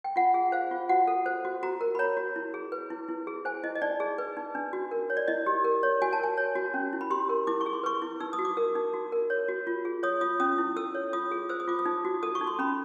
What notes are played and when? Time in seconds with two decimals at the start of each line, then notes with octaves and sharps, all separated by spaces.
0.04 G5
0.16 F4 F#5
0.34 G#4
0.52 C5 F5
0.71 F4
0.89 F#4 F#5
1.07 A4
1.26 C5
1.45 F#4
1.63 F#4 A#5
1.81 A#4
1.95 B5
1.99 C#5 A#5
2.17 F#4
2.36 E4
2.54 G#4
2.72 B4
2.90 E4
3.08 E4
3.27 G#4
3.45 C5 G#5
3.64 E4 D#5
3.75 D#5
3.82 D#4 D5
4.00 G#4
4.18 B4
4.37 D#4
4.55 D4
4.73 F#4
4.91 A#4
5.10 C#5
5.17 D5
5.28 E4 D#5
5.46 G4
5.64 A#4
5.83 C#5
6.02 F#4 G#5
6.13 A5
6.20 A#4 G#5
6.38 C#5
6.56 F#4
6.74 C#4
6.93 E4
7.01 B5
7.11 G4 C6
7.29 A#4
7.47 E4 D6
7.61 C#6
7.66 G#4
7.73 C6
7.83 B4 C#6
8.02 E4
8.20 D#4 E6
8.33 D#6
8.39 F#4
8.45 D6
8.57 A#4 E6
8.75 D#4
8.94 F#4
9.12 A#4
9.30 C#5
9.48 F#4
9.67 F4
9.85 G#4
10.03 C#5 D#6
10.21 F4 D#6
10.40 C#4 D#6
10.58 E4
10.76 A4 E6
10.95 C#5
11.13 F4 D#6
11.31 G#4
11.49 C5 E6
11.60 D#6
11.67 F4 D6
11.79 D#6
11.85 D#4
12.05 F#4
12.23 A4 D#6
12.35 C#6
12.41 D#4
12.47 C6
12.59 C#4 B5